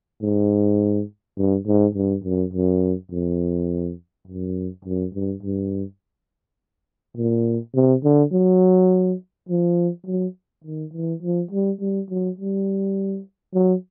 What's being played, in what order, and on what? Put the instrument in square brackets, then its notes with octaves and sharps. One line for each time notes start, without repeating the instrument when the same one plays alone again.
[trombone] G#2
G2
G#2
G2
F#2
F#2
F2
F#2
F#2
G2
G2
A#2
C3
D3
F#3
F3
F#3
D#3
E3
F3
G3
G3
F#3
G3
F#3